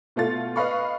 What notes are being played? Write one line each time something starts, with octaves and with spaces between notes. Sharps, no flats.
B2 A3 F4 A6
B4 D#5 F5 B5 C#6